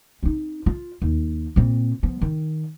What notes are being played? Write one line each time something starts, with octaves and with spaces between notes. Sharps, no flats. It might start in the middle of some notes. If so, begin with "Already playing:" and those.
C4 D#4
F4
D#2
A#2 C4
F3 B3
D#3